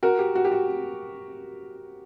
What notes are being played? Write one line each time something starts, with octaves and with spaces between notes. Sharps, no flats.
F#4 A#4
G4
F#4
G4
F#4